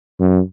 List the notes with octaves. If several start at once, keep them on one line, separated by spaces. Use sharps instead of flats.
F#2